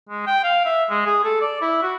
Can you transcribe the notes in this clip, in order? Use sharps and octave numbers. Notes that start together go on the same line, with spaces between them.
G#3
G5
F5
E5
G#3
G#4
A4
D5
E4
F#4